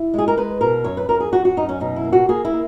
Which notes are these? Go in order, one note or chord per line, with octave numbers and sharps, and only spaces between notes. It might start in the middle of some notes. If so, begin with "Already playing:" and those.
Already playing: E4
G#3 G#4
A#4
G#3 B4
B2 A#4
F#2 C#5
B4
F#2 A#4
G#4
F#2 F#4
F#4
F#2 D#4
C#4
B2 D#4
E4
A#3
F#4
A#3 G#4
E4
A#3